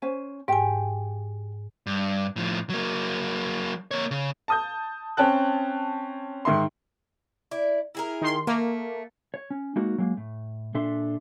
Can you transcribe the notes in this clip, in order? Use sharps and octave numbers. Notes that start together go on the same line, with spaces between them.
C#4 C5 G#5
G#2 G4 G5 G#5
G2
A2 F3
F#3 A#3
A#3 C#5
C#3
A5 D#6 G6
C4 C#4 G5 A5 F#6
G#2 D#3 E5 C6
E4 D5
E4 G#4 A#4
D#3 C6
A3 A#3
C#5
C#4
G#3 A#3 D#4 F#4 A#4
F#3 G#3 A#3
A2
A#2 D4 A4 E5 C6